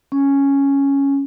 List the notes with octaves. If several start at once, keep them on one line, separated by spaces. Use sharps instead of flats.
C#4